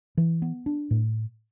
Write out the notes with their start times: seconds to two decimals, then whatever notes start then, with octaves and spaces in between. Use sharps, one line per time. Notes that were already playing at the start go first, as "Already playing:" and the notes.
0.17 E3
0.42 B3
0.66 D4
0.91 A2